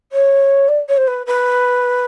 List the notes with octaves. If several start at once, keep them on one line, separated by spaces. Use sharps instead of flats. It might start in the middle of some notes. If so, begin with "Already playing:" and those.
C#5
D5
C#5
C5
B4
B4